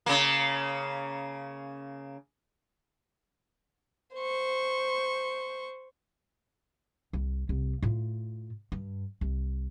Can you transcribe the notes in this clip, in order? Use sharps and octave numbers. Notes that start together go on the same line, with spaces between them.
C#3 A#3
C5 C#6
C2
C2
A2 F4
G2
C2